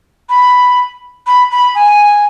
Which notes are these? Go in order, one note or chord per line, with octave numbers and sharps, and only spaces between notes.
B5
B5
B5
G#5